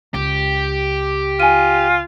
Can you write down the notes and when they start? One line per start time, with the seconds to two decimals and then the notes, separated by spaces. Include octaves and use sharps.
0.14 C#2 G4
1.40 F4 G#5 D#7